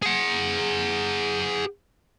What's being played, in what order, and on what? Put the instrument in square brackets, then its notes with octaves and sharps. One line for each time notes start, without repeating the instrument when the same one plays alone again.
[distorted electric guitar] G#4 F#5